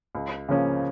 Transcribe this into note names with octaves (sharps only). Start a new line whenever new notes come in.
C#2
C#3 F3 A#3 C#4